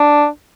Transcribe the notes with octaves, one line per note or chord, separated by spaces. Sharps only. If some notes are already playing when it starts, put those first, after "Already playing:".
Already playing: D4